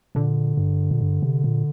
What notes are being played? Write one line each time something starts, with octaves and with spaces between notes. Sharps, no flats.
A#2 D3
G2
A#2
G2
C3
A#2